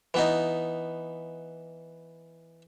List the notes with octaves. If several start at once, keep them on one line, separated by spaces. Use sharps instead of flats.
E3 B3 D#4